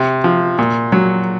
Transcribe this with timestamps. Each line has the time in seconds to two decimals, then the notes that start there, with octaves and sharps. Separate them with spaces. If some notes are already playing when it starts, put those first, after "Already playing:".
Already playing: C3
0.24 F3
0.59 A#2
0.92 F#3